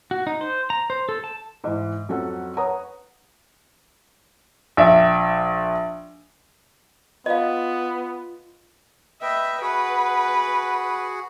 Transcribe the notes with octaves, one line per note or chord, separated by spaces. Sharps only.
F#4
D#4
C5
A#5
C5
A4
A5
G#2 E3
F2 F#3 C#4 A4 F#5
B4 C#5 F#5 A#5 D#6
A#1 E5
B3 F4 D#5 F5
B4 D#5 E5 G5
F#4 G#4 B4 F#5